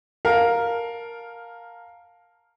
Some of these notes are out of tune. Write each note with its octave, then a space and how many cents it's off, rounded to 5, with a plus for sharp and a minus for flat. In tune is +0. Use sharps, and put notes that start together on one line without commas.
A#4 +0 F5 +10 A5 +0